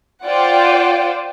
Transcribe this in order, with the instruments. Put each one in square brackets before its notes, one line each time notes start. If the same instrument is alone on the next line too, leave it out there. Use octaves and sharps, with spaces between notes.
[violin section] F4 C5 D5 F#5 G5